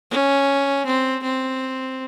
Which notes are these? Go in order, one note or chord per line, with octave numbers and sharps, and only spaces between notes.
C#4
C4
C4